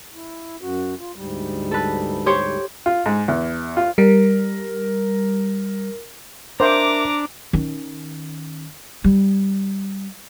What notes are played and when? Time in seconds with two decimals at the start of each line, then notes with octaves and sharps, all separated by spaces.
0.14 E4
0.61 F#2 F#4
0.99 F4
1.15 D2 G#2 G3
1.71 A4 B4
2.26 G4 C5 C#5
2.86 F4
3.06 G#2
3.28 E2
3.77 F4
3.98 G3 A#4
6.60 D4 A#4 C5 E5 A#5 D6
7.53 D#3 C#4
9.04 G3